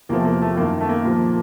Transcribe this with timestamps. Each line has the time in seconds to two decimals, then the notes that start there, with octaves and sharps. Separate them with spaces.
0.09 E2 C3 F3 A#3
0.20 A3
0.25 A#3
0.42 A3
0.56 F#2 D#3 A#3
0.81 A3
0.89 A#3
1.05 A#2 F3